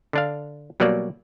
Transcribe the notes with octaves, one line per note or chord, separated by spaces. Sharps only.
D3 D4 F5
B2 F#3 G3 A#3 D5